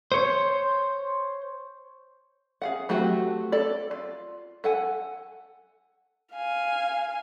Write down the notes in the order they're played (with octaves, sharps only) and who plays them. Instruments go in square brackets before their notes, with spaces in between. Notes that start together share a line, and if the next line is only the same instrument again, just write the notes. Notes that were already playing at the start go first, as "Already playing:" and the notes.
[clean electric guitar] C5 C#5
[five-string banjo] G#4 F5 F#5
F#3 A3 C4 F#4 G4
A4 D5
F4
A4 F#5 G#5
[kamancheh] F5 G#5